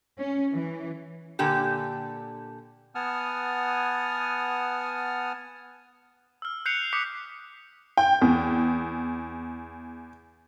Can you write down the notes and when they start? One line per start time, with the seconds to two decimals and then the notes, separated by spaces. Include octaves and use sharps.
0.18 C#4
0.52 E3
1.39 A#2 D3 G4
2.95 B3 F#5 G#5 A5 D#6 F6
6.42 E6 F6
6.66 F#6 G6 C7 C#7 F7
6.93 D6 D#6 G6 B6 C#7
7.97 G5
8.21 E2